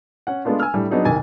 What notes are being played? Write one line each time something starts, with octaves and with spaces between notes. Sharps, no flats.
C#4 F#5
G#3 A3 B3 D4 F4
G#5 E6 F6
A2 G3 D4
F#3 B3 D4 D#4 F#4 G#4
C2 F2 D#3 G#5 A6